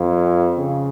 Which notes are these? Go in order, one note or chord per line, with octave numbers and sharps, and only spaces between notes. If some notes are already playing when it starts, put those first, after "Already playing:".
Already playing: F2
C#3